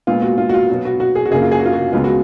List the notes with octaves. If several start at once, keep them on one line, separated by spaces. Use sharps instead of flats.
A#2 G#3 B3 F4
F#4
F4
F#4
F4
B2 F#3 B3
F#4
F#4
G#4
F#4
F#2 C#3 F#3 A#3 G#4
F4
G#4
F#4
F4
F#4
C#2 C#3 G#3 B3 F4
F#4